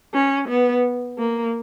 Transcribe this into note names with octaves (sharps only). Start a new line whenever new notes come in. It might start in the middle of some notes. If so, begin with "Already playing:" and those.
C#4
B3
A#3